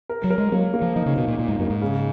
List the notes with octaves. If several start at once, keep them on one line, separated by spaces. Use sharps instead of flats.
A#4
F#3
A#4
G#3
F#3 A#3
A#3
F3
F3 D#4
C#3
B2 A#3
A#2
A#2 D#4
G#2
F#2 A#3
G#2
C#3